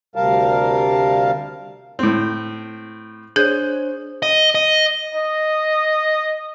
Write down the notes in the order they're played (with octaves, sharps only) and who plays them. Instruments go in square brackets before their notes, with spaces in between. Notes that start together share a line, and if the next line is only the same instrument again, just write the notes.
[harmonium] D2 C3 G3 A#4 F5 A5
[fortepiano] A2 C4
[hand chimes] D4 C5 C#5 [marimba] G#4 G6 G#6
[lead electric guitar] D#5
D#5
[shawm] D#5